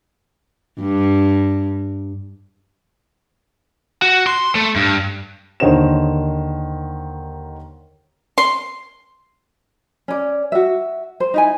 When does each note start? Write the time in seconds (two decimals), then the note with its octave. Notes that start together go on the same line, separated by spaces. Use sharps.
0.80 G2
4.02 F#4
4.27 C6
4.55 A3
4.76 G2
5.60 D#2 D3 D#3 C5 C#5 E7
8.38 C6
10.08 C#4 D5
10.52 F#4 E5
11.20 C5
11.34 D#4 E4 G#5